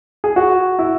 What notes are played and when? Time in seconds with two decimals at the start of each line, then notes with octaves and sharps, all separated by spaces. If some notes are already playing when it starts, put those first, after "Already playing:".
0.24 G#4
0.36 F#4
0.79 E4